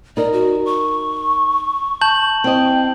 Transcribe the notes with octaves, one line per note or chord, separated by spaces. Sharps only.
D#4 A#4 D5
F#4
C#6
A5 G6 F#7
C4 E4 D#5 G5